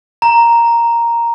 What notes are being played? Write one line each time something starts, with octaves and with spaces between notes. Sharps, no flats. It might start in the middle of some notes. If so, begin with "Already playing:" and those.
A#5